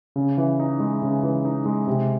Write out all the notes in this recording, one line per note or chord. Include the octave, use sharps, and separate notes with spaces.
C#3
E3
D#4
G#3
C#3
E3
D#4
G#3
C3